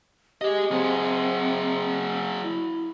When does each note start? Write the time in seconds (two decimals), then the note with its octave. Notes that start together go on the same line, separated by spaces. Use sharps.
0.41 G4 G#4 D#5
0.71 F#3 C4 G#4
2.43 E4